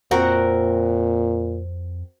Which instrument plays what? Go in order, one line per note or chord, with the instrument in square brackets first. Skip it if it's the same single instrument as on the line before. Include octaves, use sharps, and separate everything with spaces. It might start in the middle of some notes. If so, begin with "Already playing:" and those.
[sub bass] F2 [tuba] A#2 [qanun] C4 F#4 A#4